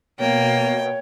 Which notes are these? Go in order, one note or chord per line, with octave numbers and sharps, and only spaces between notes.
B2 A#3 C#5 G5